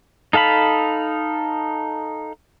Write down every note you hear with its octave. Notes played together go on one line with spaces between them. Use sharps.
D#4 A4 F5 A5 B5